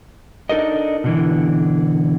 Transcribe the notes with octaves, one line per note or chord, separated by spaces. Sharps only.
D4 D#4 A4 A#4 D#5
B2 D3 E3